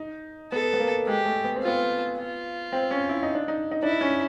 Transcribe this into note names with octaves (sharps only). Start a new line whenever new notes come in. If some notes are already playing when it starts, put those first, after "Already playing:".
Already playing: D#4
B3 A4
B3
A#3
G#3 G4
A3
B3
C4
F4
B3
F4
C4
C#4
E4
D#4
D4
D#4
D#4
D4 E4
C#4